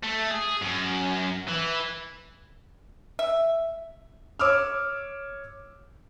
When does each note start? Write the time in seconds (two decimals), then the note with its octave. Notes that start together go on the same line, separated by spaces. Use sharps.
0.03 A3
0.31 G#4
0.62 F#2
1.48 E3
3.19 E5
4.39 C#5 D6 E6 F6